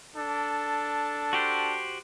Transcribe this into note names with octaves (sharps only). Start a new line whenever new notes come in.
D4 A4
F#4 G4 C5